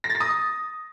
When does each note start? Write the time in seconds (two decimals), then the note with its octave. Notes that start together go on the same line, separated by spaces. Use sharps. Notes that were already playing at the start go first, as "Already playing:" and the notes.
0.04 A#6
0.10 A6
0.15 A#6
0.20 D#6